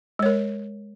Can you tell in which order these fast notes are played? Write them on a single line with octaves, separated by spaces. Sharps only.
G#3 C#5 A#4